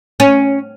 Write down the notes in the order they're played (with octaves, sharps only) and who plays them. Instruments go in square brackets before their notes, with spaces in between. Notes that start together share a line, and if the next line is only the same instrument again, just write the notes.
[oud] C#4